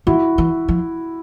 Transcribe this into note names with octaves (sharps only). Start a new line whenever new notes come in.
E3 E4 F#4
E3
F3